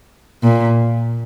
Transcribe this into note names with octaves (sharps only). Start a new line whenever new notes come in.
A#2